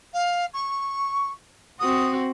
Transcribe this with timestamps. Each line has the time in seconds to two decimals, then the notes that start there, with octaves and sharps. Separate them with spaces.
0.14 F5
0.54 C#6
1.80 C4 F#4 D#6